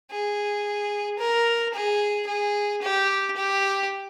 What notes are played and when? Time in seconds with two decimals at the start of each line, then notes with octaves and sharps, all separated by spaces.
0.11 G#4
1.19 A#4
1.74 G#4
2.27 G#4
2.81 G4
3.36 G4